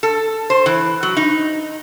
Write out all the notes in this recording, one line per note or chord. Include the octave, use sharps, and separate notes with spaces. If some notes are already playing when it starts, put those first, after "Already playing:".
A4
C5
E3
F#3
D#4